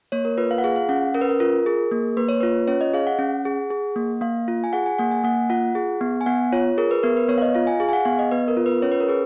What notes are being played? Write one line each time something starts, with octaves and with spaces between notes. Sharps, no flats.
A#3 C#5
A#4
F4 B4
F5
F#5
G#4 F5
F5
C#4 F#5
C#4 A#4
B4
A#4
F4 A#4
G#4
A#3
A#3 B4
C#5
F4 B4
C#4 C#5
D#5
G#4 F5
F#5
C#4
G#4
G#4
A#3
A#3 F5
F4
G#5
G#4 F#5
G#5
A#3 F#5
G#5
A#3 F#5
F4 F#5
G#4
B3
G#5
B3 F#5
F4 C#5
G#4 A#4
B4
B3 A#4
B4
B3 C#5
F5
D#5
F4 F5
G#5
G#4 F5
G#5
F#5
B3 F5
D#5
B3 B4
A#4
F4
B4
C#4 C#5
B4
A#4
G#4 B4